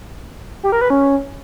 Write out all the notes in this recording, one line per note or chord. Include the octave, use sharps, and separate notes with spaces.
G4
A#4
B4
C#4